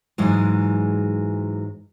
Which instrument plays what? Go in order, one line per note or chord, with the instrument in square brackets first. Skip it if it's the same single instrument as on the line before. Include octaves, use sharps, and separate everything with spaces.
[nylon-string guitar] G#2 E3 F#3 G#3